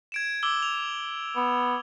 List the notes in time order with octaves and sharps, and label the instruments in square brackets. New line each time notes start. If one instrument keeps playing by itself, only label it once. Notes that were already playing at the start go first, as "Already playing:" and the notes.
[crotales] G#6 D7 E7
D6 E6 G7
F7
[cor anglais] B3